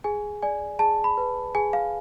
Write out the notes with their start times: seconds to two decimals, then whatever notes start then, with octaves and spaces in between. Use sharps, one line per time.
0.04 G#4 G#5
0.42 D5 G#5
0.79 G#4 A5
1.04 B5
1.17 B4
1.55 G#4 G#5
1.73 F5